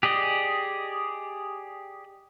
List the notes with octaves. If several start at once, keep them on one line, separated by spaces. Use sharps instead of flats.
G4 G#4 D5 D#5